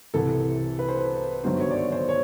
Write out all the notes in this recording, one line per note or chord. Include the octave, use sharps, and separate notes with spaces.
C2 C3 E3 A4
B4
C5
B4
G1 G2 D#3 F#3 C5
C#5
D5
C#5
C5
C#5